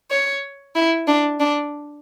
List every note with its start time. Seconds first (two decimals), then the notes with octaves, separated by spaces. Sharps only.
0.11 C#5
0.76 E4
1.07 D4
1.40 D4